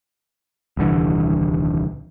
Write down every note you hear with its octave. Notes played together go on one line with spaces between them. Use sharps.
D#1 C2 D3 E3